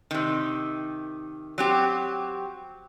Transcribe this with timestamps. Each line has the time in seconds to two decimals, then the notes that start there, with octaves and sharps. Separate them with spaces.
0.11 C3 D#3
1.58 F#3 C4 G4